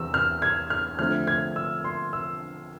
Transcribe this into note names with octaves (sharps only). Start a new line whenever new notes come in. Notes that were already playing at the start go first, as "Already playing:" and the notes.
Already playing: E2 C3 E3 E6
F6
G#6
F6
D3 F3 A3 C4 F6
G#6
E6
C6
E6